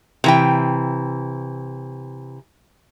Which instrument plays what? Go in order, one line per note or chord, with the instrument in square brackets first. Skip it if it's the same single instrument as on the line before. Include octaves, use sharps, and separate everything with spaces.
[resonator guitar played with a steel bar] C3 E3 G5